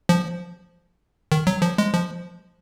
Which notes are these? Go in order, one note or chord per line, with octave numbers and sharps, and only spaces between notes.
F3
D#3
F#3
F3
G#3
F3